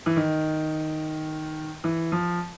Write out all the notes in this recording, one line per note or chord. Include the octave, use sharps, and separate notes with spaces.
E3
D#3
E3
F3